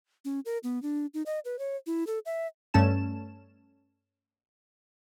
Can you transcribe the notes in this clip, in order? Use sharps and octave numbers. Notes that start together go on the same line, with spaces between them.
C#4
A#4
B3
D4
D#4
D#5
B4
C#5
E4
A4
E5
G2 A3 C#4 A5 E7